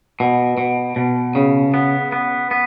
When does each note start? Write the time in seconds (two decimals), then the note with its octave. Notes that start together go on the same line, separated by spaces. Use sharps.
0.20 B2
0.58 B2
0.96 B2
1.35 C#3
1.74 B3
2.12 B3
2.51 B3